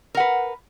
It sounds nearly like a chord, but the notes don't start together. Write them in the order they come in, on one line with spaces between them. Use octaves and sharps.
A#4 F#5 B4